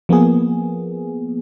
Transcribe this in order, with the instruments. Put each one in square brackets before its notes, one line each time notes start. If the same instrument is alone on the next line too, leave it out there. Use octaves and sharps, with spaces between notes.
[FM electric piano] F3 A#3 B3 G#4